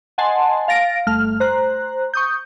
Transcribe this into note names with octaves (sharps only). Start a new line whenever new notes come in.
D#5 F#5 G#5 A5 C6
F5 A6 A#6 D7
G1 A3 F6
C5 A#5 F#6
C#6 D#6 G6